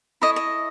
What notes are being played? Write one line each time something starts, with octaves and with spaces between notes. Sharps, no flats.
E4 A4 C#5 D#5
D#5